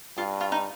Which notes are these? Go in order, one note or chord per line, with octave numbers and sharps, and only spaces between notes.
G2 F4
F4
D#4